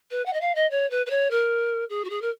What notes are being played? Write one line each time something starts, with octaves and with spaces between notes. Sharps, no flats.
B4
F#5
D#5
F5
D#5
C#5
B4
B4
C#5
A#4
G#4
F#4
G#4
A#4